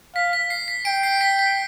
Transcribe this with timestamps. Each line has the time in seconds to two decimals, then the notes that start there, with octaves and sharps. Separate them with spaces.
0.15 F5 B6
0.33 B6
0.50 C7
0.68 B6
0.85 G5 D7
1.03 C7
1.21 B6
1.39 B6